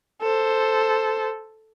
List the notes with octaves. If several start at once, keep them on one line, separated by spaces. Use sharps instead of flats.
A4 C5